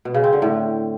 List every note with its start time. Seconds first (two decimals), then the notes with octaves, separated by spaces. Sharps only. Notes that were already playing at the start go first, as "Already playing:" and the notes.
0.05 B2
0.14 C#3
0.24 C4
0.33 D3
0.42 A2